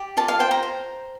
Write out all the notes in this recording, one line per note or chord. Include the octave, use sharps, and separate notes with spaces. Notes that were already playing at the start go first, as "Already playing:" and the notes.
Already playing: G4 D5
F4 A5
F5
C5 G5
A#5
C5